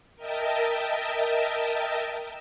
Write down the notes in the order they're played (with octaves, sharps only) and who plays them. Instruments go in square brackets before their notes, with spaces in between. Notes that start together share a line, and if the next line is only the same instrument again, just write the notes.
[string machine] A#4 D#5 E5 G5 A5